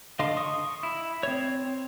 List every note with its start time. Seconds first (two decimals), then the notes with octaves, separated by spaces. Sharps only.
0.19 D3 D4 D#5 F5 C6
0.37 C#6 D#6
0.83 E4
1.23 C4 C#5